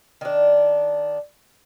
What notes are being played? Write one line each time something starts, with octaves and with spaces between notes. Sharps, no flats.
D#3 D4